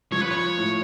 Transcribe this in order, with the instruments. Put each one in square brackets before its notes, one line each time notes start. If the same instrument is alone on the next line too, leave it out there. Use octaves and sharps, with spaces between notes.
[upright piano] F3 [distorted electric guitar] C#5
[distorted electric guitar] B4
C#5
[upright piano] A2